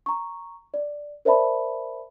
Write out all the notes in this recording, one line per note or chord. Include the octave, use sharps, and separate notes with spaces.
A#5 C#6
D5
A#4 C5 D5 E5 A5 B5